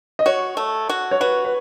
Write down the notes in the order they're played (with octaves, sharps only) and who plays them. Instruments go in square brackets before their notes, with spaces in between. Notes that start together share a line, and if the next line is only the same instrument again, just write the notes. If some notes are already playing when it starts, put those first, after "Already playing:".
[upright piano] D#5
[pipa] F#4 [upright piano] C#5
[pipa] A3
F#4
[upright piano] C#5
[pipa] F#4 [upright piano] B4
[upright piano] B4